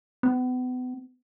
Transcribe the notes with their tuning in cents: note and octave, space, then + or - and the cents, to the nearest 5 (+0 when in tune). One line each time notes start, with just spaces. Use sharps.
B3 +35